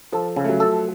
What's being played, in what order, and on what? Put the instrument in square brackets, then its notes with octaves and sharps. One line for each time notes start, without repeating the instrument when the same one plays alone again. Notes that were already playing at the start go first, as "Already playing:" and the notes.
[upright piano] F3 [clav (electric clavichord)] A4
[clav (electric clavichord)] C#3
[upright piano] A3
F#3
[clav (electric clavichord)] A4